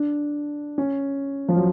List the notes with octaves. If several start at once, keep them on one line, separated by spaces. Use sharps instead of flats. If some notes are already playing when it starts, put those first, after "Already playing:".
Already playing: D4
C#4
F3
F#3